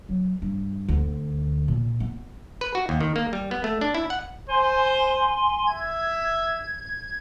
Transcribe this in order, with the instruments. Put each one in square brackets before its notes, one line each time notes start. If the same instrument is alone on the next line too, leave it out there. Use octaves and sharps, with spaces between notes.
[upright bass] F#3
G2
D2
A#2
B3
[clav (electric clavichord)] B4
F#4
D#2
D#3
A#3
G3
B3
A3
D4
E4
F#5
[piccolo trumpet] C5 [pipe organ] G#5 C6
[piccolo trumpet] E5 [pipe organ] G#6